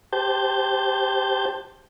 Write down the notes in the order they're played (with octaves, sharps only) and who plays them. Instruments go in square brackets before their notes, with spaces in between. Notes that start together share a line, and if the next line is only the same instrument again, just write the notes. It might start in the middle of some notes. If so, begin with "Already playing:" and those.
[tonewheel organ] G4 C5 A5 G6